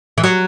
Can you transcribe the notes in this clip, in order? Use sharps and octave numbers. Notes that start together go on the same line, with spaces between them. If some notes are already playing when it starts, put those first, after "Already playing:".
E3
F#3